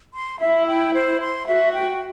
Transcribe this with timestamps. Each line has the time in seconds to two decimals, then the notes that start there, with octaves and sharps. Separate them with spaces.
0.14 C6
0.40 E4 E5
0.67 G5
0.94 C5
1.21 C6
1.47 F#4 E5
1.73 G5